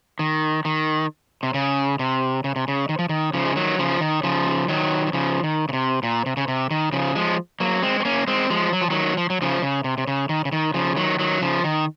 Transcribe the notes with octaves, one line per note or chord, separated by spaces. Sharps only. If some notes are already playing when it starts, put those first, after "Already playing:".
D#3
D#3
C3
C#3
C3
C#3
C3
C#3
D#3
F3
D#3
C#3 F3
G#3
D#3 F#3
C#3 F3
D#3
C#3 F3
D#3 F#3
F#3
C#3 F3
D#3
C#3
C3
A#2
C3
C#3
C3
D#3
C#3 F3
F3 G#3
F#3 A#3
G#3 C4
C4
A#3 C#4
G#3 C4
F3 G#3
F#3
F3
D#3 F#3
F3
F#3
C#3 F3
C#3
C3
C3
C#3
D#3
C#3
D#3
C#3 F3
D#3 F#3
D#3 F#3
C#3 F3
D#3